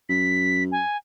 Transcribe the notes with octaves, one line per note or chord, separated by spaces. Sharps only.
F#2 B6
G#5